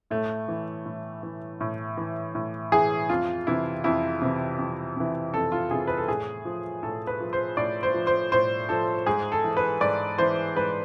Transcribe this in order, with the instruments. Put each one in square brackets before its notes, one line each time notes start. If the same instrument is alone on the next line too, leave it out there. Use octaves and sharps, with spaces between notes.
[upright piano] A2 A3
E3
A2
E3
A2
E3
A2
E3 G#4
F2 F4
C3 E3 E4
F2 E4
C3 E3
F2
C3 E3
F2 A4
F4
C3 E3 G#4
B4
A4
A2 G#4
F3
A2 A4
B4
F3
C5
A2 D5
C5
F3
C5
A2 C5
F3 A4
G#2 G#4
A4
E3
B4
G#2 D5
E3 C5
G#2 B4